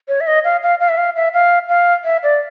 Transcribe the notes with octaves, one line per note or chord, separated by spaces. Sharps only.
C#5
E5
D#5
F5
F5
F5
E5
F5
E5
F5
F5
E5
D5